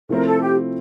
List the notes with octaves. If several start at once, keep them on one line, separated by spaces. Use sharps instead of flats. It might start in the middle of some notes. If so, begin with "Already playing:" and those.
C3 F3 A3 C4 E4 A#4
A4
G4